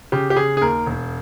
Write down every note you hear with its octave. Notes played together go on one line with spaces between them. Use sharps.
C#3 G4
G4
C#3 G#4
G#4
D#2 A#4
E1